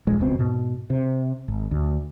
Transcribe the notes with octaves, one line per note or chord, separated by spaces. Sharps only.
D#1 A#1 G#3
E1 C#2 B2 C4
G#2 B2
C3
G#1
D2